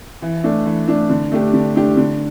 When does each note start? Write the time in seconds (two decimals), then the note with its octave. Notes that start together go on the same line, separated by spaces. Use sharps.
0.22 E3
0.44 A3 D4
0.66 E3
0.88 A3 D4
1.09 D3
1.32 A3 D4 G4
1.54 D3
1.76 A3 D4 G4
1.97 D3